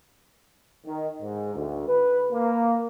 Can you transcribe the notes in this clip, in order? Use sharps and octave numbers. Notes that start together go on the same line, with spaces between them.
D#3
G#2
D2
B4
A#3